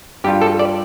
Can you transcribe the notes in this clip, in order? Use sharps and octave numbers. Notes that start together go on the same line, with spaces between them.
G2 G3 F4 G4
A4
D5